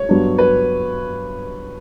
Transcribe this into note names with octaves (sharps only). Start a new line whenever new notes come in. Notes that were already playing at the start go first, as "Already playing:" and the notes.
Already playing: C#5
G2 F#3 B3 D4
B4